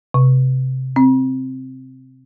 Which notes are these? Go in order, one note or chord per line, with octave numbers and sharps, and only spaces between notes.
C3
C4